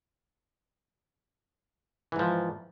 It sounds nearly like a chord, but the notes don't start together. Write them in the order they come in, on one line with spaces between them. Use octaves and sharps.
E3 G#2 F3